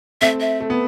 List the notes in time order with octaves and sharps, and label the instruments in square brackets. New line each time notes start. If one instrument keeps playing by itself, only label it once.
[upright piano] A3 C4 [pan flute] E5
[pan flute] E5
[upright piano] A3
B3